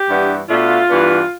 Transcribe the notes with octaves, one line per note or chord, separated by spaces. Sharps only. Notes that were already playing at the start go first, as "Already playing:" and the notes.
Already playing: G4
G2 E3 B3 D4
B2 A3 D4 F4
G2 E3 B3 D4